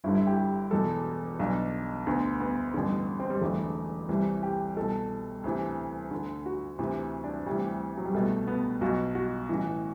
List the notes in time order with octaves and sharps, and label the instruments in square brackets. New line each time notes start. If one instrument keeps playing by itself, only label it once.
[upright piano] G1 G2 D3 E4
E4
G4
G4
E1 E2 B2 A4
B1 B2 D4
D2 D3 B3
B3
A1 G2 D3
C4
G3
E1 E2 D3 A3
C2 C3 E3
G4
C2 B2 A4
D2 C3 E3
D2 D3
F#4
D2 C3 E3
D4
D2 C3 E3 G3
F#3
G3
C2 B2 A3
B3
B1 B2 F#4
F#4
A1 A2 E3